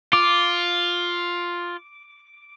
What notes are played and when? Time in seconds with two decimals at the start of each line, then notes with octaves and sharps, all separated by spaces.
0.13 F4 D6